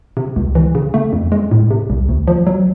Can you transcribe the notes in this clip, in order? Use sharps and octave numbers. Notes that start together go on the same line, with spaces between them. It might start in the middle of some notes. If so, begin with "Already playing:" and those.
C3
C#2
E3
C#3
A3
F2
G#3
A2
C3
C2
D2
F3
F#3